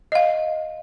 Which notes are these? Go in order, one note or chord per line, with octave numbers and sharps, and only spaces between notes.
D#5 F5